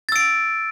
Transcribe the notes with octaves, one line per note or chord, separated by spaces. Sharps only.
E6 A6 D7